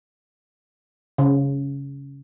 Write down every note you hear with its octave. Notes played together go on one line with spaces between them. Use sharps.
C#3